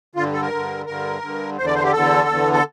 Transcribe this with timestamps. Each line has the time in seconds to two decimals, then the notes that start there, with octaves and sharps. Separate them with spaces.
0.15 G2 D3 F4
0.33 A4
0.42 A#4
0.51 G2 D3
0.86 G2 D3 A#4
1.22 G2 D3
1.57 E2 C5
1.61 D3 D5
1.75 C5
1.84 G4
1.93 E2 D3 A4
2.28 E2 D3
2.53 A4